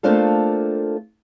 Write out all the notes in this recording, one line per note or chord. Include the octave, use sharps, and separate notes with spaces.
A3 A#3 C4 D4 F4 A4